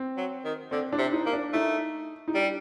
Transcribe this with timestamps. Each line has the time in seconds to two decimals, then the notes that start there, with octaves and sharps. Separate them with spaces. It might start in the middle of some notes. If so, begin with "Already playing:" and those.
Already playing: C4
0.17 F#3
0.45 D#3
0.71 D3 C4
0.93 D4
0.98 C3
1.13 D#4
1.26 A#3
1.33 D4
1.53 A3 D#4
2.28 D#4
2.35 G3 D4